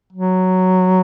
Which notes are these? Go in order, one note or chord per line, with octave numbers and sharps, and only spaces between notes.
F#3